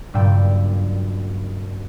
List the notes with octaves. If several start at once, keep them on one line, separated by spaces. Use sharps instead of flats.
F#1 G2 A#2 D5 G5 E6